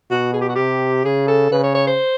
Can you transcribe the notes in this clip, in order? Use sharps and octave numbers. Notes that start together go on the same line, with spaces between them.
B2 F#4
G#4
G4
F#4
C3 G4
C#3 G#4
A4
C#3 B4
C#5
C#5
C5